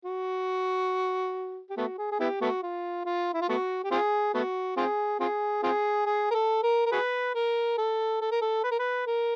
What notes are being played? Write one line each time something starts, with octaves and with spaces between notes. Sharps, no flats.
F#4
G4
A3 B3 F#4
G#4
G#4
B3 E4 G4
A3 B3 F#4
F4
F4
E4
F4
A3 B3 F#4
G4
C4 F4 G#4
A3 B3 F#4
C4 F4 G#4
C4 F4 G#4
C4 F4 G#4
G#4
A#4
A4
A#4
A#4
F#4 G#4 B4
A#4
A4
A4
A#4
A4
B4
A#4
B4
A#4